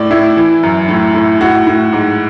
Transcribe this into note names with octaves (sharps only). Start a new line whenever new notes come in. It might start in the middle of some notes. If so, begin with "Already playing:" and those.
Already playing: A2 D5
A2 E4
E3
F#2
A2
A2
A2 F#4
A2
G#2